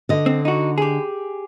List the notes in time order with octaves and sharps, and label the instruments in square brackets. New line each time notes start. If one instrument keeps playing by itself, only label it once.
[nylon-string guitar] D3 D#5
[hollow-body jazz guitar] C4
D#4 F#4
G4 G#4